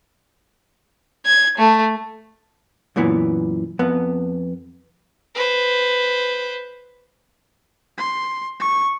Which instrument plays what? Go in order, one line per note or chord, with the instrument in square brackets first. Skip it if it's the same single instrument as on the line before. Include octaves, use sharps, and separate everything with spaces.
[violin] G#6
A3
[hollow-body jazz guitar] F#2 A#2 E3 B3
F2 B3
[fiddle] B4 C5
[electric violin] C6
C#6